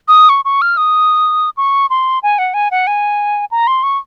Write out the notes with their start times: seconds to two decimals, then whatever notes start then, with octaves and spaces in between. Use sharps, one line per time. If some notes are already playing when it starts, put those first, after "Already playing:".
0.08 D#6
0.29 C#6
0.45 C#6
0.62 F6
0.77 D#6
1.57 C#6
1.90 C6
2.23 G#5
2.39 F#5
2.54 G#5
2.71 F#5
2.87 G#5
3.51 A#5
3.67 C6
3.83 C#6